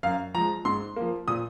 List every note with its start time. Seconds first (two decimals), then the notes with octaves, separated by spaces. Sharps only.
0.03 F#2 F5
0.34 F3 G#3 A#5
0.65 G#2 C6
0.96 F3 A#3
1.28 A#2 D#6